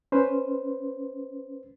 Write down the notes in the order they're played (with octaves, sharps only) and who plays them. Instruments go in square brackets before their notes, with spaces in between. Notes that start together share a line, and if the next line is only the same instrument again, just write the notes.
[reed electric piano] C#4 B4 C5